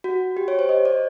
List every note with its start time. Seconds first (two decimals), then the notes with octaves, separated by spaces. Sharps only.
0.04 F#4
0.37 G4
0.48 C#5
0.59 C5
0.69 D#5
0.85 D5